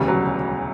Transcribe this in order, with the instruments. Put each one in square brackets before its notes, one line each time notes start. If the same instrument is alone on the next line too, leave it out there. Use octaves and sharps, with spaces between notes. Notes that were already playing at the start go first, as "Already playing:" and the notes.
Already playing: [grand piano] E1 D2 C#3 E3 G3
F#3